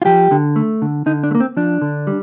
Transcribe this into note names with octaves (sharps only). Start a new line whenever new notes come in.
F4
F3 G4
D3
A3
D3
D3 D#4
D4
A3
A#3
C4
F3 D4
D3
G3